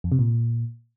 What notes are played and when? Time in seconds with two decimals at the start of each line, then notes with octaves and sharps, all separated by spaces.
0.04 F2
0.12 C3
0.19 A#2